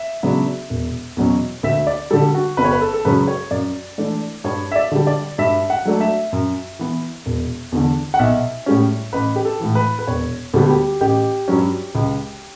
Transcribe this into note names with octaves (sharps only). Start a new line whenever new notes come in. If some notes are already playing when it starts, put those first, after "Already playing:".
Already playing: E5
C#3 F#3 B3 D4
E1
E2 B2 F#3 C#4
D2 E5
D5
D3 G3 A4
F#4
G1 B4
C#5
B4
A4
A4
F#2 C#3 F#3 C#4 B4
C#5
F#2 D5
E3 A3 D4
G2 C#5
E5
D5
D3 G3
D5
G2 E5
F#5
F#3 A3 D4
E5
F#2
E3 B3
E1
E2 D3
F#5
B1 E5
A2 G3 C#4
A1 B4
G4
A4
A2 E3
B4
B4
E1 C#5
D2 D3 G3 B3
G4
A1 G4
G2 F#3 C#4
C#2